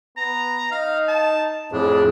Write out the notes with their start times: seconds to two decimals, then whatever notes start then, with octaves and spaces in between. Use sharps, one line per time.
0.17 B3 A#5
0.72 D#4 F5
1.09 A5
1.72 F2 A2 F3 D4 G#4